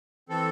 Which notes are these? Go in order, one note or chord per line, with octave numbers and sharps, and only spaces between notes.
E3 C4 A4